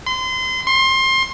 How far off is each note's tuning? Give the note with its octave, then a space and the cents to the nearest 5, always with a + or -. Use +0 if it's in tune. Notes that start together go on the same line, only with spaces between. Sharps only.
C6 -30
C6 +25